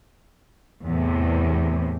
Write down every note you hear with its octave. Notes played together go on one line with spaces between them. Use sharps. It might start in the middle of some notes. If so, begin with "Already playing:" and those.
E2 A2 C3